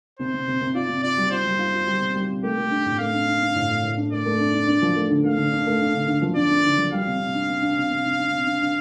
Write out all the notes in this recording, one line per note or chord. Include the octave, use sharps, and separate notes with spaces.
C3 C5
C3
C3
C3
F4 D5
C3
F4 D5
G3
F4 C5
G3
F4
F4
G3
C3
G3
C3
A3 G4
A3
D4
A2
A3 F5
D4
D4
D4
A2
A2
A2
D4
A3 D5
A3
D4
D4
D4
F3
A3
D3
A3 F5
D3
D4
A3
D4
D3
D3
F3
D4 D5
D4
D3
F3
G3 F5
C3
C3
D4
C3
D4
C3
C3
D4
D4
C3
D4
D4